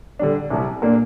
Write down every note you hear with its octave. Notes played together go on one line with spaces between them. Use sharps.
D3 G3 D4
C2 C3 G3
A#2 A#3 D4